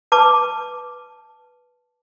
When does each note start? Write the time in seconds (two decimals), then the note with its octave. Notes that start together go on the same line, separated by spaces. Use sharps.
0.12 B4 A5 D6